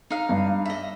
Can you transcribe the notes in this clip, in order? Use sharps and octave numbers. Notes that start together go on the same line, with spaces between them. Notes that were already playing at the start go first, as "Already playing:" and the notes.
D#4 F5
G2
D#5 E5